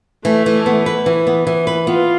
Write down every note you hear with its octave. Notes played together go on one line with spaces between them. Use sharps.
E3 A3
E3
B3
B4
E3
B3
E3
B4
B3 F4